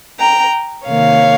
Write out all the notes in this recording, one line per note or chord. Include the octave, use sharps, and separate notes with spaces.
G5 A#5
C3 D#3 A#3 C#5 F5